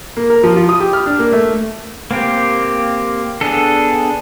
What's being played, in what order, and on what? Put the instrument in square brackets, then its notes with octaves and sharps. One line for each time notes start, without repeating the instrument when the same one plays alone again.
[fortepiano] A#3
A#4
F3
F4
D#6
G4
F6
D4
A#3
A3
[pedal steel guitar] A#3 C4 G4
B3 D4 G#4 A4